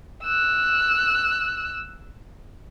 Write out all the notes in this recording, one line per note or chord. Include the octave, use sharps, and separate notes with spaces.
E6 F#6